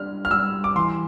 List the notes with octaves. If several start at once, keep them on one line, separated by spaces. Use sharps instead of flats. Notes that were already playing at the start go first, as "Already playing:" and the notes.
Already playing: G3 D4 F6
F6
G3 E6
D6
E3 C6